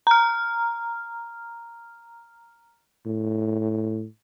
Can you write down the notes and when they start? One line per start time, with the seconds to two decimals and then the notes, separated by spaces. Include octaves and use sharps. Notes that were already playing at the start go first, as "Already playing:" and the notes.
0.07 A#5 F6
3.06 A2